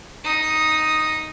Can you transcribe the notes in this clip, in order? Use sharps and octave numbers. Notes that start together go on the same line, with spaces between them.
D#4 D#6